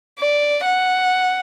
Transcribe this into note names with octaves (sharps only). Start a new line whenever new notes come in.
D5
F#5